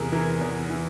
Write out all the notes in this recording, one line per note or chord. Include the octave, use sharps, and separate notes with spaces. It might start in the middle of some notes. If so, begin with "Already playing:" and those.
Already playing: E2 C3 G#4 A#4
E3 A#4
E2
E3